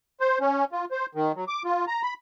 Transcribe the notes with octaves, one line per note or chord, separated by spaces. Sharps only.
C5
C#4
F4
C5
D#3
F#3
D6
F4
A#5
B5